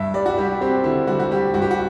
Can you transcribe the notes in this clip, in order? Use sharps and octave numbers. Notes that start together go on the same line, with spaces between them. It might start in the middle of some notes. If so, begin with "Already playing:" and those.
Already playing: G2 E5
G3 D5
F#4
G3 G4
C4 G4
D3 E4
G3 F#4
F#4
G3 G4
G2 F#4
G4
F#4